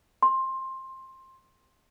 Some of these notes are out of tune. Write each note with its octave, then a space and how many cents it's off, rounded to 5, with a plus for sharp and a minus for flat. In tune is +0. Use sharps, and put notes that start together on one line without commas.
C6 +15